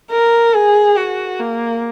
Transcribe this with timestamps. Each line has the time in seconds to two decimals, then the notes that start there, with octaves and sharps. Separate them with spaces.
0.11 A#4
0.54 G#4
0.97 F#4
1.40 A#3